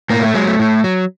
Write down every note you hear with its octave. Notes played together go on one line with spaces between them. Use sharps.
A2 A#3
A3
F#3 G#3
A3
A2
F#3